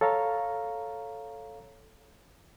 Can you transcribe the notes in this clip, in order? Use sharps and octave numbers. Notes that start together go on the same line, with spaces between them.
A4 C#5 F5 A#5